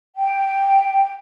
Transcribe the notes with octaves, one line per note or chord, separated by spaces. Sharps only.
G5